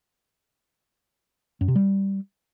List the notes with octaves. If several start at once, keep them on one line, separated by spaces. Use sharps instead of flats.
F#2
C3
G3